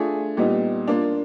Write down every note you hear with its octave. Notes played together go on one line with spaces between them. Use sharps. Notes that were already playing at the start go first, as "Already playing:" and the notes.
Already playing: A3 D4 F4 G#4
A#2 G3 B3 D#4
A#3 D4 F4